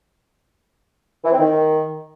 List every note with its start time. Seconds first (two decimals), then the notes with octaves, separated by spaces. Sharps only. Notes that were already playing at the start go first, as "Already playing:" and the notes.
1.24 E3
1.32 C4
1.39 D#3